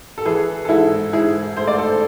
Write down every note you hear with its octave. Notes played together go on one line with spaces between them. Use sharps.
A4
E3 G#4 B4
A4
G#2 E4 G#4
G#2 E4 G#4
A3 C5
D5
A4 C5